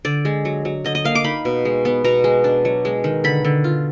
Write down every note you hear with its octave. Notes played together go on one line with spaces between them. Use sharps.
D3 D5
G#3
F#3
F#3
D3 D#5
D#5
A#3 F5
D6
D#4 B5
B2
G#3
B3
B2 A#5
G#3
D4
F#3
G#3
D#3
D3 B5
D3
F4